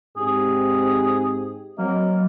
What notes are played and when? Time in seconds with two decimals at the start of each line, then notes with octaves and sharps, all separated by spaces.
0.17 G#2 C4 G4 G#4
1.78 F#3 A#3 C4 F#4 D#5